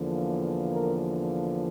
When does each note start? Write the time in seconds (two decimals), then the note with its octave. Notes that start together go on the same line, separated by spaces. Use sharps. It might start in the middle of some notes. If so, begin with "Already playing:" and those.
Already playing: E2 D3 F3 A#3
0.71 A#4